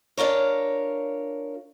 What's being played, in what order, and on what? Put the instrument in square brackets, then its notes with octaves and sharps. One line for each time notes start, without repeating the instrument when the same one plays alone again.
[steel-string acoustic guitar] D4 F4 A#4 C#5